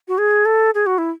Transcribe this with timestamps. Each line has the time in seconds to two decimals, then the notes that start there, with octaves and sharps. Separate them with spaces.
0.08 F#4
0.18 G#4
0.45 A4
0.74 G#4
0.86 F#4
0.98 E4